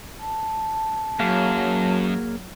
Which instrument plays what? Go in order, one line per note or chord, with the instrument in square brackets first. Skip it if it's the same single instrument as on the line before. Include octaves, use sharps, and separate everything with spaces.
[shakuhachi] A5
[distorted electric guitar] F#2 [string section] F#3 [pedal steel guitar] A#3 G#4 F5